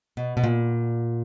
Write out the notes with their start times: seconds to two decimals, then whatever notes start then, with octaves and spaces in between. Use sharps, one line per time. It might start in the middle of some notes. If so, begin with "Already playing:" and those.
0.17 B2
0.37 B2
0.44 A#2